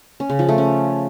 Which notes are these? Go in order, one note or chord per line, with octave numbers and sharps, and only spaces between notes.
C#4
C#3
F3
A3
C#4